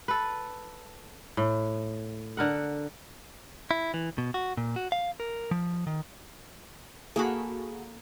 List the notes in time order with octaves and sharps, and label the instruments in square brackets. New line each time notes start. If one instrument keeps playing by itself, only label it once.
[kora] A4 B4
A2
D3 A#4 F#5
[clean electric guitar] E4
E3
B2
F#4
A#2
F#4
F5
A#4
F3
D#3
[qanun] A#3 A4 B5 [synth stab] F#4 G#4